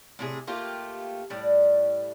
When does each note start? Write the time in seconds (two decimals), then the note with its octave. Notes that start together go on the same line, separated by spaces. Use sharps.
0.19 A2 C3 G#4
0.47 A3 A#3 F4 G4
1.30 A2 G3